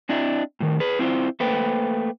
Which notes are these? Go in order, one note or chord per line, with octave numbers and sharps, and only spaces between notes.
C4 D4 E4 D#5 E5
A2 D#3
G#4 B4
C4 E4 F4 C5
A3 A#3 B4 C5 G5